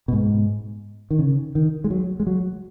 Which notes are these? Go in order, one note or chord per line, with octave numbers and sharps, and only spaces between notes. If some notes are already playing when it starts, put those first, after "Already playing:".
B2
G#2
D#3
C#3
D#3
G#3
F#3
G#3
F#3